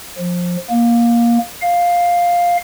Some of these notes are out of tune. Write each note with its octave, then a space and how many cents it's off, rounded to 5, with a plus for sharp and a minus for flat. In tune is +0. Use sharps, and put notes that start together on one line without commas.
F3 +20
A#3 +15
F5 +5